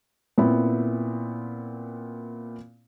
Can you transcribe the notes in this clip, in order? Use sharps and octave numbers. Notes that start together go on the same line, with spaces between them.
A#2 B3 C4 E4